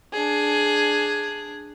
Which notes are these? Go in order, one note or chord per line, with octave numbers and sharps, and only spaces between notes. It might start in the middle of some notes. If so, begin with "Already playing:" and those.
D4 G#4